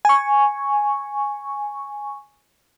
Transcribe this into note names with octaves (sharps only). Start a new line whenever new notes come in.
G#5 C#6